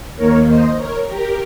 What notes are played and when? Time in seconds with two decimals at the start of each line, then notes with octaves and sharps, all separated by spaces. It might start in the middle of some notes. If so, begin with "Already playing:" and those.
0.16 D#2 D#3 A#3 A#4 C#5
0.46 C5 D#5
0.76 A#4 C#5
1.06 G4 A#4